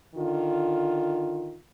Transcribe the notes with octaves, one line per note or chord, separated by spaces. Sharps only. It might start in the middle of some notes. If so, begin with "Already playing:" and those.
D3 D#3 F4